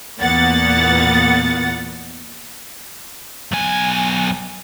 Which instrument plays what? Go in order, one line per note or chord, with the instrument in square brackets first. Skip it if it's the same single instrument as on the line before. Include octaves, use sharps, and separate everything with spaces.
[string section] E2 A#2 A#3 B3 F#5 A6
[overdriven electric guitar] B1 G#5